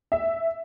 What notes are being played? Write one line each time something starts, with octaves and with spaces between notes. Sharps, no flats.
E5